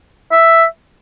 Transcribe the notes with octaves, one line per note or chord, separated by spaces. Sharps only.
E5